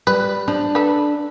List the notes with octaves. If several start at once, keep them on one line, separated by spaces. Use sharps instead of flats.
G3 B4
F3 D4
A4 B4